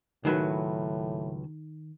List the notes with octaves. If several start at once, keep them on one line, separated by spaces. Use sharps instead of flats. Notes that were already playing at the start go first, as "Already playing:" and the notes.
C#2 A2 D#3 F#3 B4